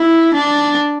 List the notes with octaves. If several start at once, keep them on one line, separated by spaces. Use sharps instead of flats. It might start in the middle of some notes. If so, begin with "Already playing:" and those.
Already playing: E4
D4